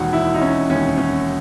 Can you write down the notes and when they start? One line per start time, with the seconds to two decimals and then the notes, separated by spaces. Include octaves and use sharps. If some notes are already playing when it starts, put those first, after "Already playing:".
Already playing: E1 D#2 D#3 F#4
0.13 E4
0.34 D#4
0.41 C#4
0.70 E1 D#2 D#3 C#4
0.98 C#4